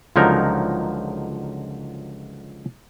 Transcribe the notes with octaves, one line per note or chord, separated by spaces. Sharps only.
C#2 D3 F3 F#3 D#4 A#4